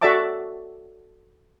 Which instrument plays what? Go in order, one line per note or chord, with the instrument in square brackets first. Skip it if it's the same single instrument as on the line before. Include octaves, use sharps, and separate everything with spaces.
[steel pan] F#4 A4 D5 E5 A5 D6